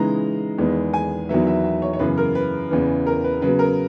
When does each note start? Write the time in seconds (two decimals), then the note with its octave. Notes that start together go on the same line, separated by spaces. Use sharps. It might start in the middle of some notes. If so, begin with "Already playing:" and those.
Already playing: C#3 E3 G#3 B3 D#4 A#5
0.58 E2 D#3 G#3 B3
0.94 G#5
1.29 E2 D#3 F#3 B3 E5
1.47 E5
1.64 E5
1.82 C#5
1.93 C#5
1.99 F#2 C#3 E3 B3 B4
2.18 A#4
2.35 B4
2.70 E2 C#3 E3 B3
3.07 A#4
3.24 B4
3.42 C#3 F#3 B3 B4
3.59 A#4